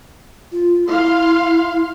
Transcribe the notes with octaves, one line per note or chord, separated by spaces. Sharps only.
F4
E4 F5 C6